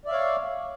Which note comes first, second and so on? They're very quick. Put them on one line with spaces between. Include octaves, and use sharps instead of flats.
D5 E5 F5 C#5